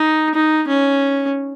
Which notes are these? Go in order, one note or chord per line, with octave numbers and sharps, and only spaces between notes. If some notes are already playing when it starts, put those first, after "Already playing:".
Already playing: D#4
D#4
C#4